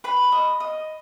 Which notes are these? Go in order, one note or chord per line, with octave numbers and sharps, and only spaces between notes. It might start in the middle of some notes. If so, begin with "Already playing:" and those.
B4 B5
D#5
D#5